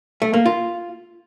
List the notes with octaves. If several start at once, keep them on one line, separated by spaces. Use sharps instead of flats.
A3
A#3
F4